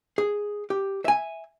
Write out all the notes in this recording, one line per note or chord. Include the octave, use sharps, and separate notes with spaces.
G#4
G4
E5 G#5